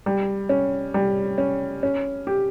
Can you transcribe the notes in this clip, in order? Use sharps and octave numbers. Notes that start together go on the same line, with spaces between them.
G3
C#4
G3
C#4
C#4
G4